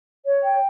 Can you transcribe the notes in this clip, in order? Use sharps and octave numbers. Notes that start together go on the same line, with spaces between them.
C#5
G5